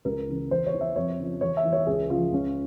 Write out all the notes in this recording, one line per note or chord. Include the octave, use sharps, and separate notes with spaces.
C#2 A#4
C#3 E3
E2 C5
C#5
E3
E5
F2 C#5
C#3 F3
E2 C#5
E5
E3
C#5
C#2 G#4
C#3 F3 F4
C#2 C#4